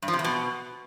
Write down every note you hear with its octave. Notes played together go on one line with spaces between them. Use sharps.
G2
F3
C3
E2
B2